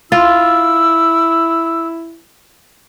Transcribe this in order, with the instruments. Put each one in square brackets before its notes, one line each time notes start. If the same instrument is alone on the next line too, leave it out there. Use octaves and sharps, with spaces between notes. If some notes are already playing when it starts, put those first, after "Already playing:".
[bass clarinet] E4 [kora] F4 [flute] E6